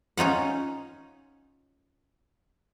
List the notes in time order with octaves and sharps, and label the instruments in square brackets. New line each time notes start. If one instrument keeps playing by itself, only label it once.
[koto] C#4 D#4 F4 F#5